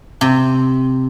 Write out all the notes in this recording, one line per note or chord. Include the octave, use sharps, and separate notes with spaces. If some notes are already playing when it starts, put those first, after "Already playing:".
C3